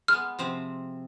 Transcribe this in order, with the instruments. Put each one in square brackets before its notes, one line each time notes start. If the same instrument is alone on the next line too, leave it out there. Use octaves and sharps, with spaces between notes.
[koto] G#3 B3 [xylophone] F6
[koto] C3 F3 C4